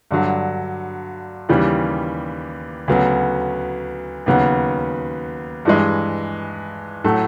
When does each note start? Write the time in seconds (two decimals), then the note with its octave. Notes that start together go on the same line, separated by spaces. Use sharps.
0.11 G2 D3 F#3
1.49 D#2 C#3 E3 G3
2.88 D2 C#3 F#3 B3
4.26 D#2 C#3 F#3 B3
5.65 G2 E3 G#3
7.04 A2 F#3 A3